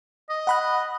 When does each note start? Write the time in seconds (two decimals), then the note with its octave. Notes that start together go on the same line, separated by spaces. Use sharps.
0.29 D#5
0.47 F#5 B5 F#6